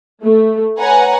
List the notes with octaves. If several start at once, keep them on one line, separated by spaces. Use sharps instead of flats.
A3
B4 C#5 F#5 G#5 A#5